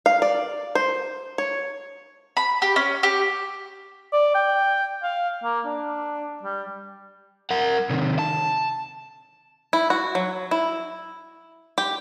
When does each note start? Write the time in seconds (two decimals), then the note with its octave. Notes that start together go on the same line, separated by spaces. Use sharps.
0.06 F5
0.22 D5
0.75 C5
1.38 C#5
2.37 B5
2.62 G4
2.76 C#4
3.03 G4
4.13 D5
4.34 G5
5.03 F5
5.44 A#3
5.65 D4
6.43 G3
7.51 A#4 F#5
7.90 C3 D#3
8.19 A5
9.73 E4
9.90 F#4
10.15 F#3
10.51 E4
11.78 G4